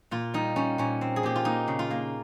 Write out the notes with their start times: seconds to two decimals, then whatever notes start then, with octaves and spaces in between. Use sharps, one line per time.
0.11 A#2 F4
0.34 G3 D#4
0.56 G3 C#4
0.78 A#2 C#4
1.01 C4
1.16 G#4
1.23 A#2 G4
1.36 F4
1.45 A#3 D#4
1.68 C#3
1.79 F4
1.90 A#3